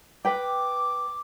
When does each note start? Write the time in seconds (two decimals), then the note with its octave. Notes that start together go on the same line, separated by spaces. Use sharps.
0.25 B4 G5 D6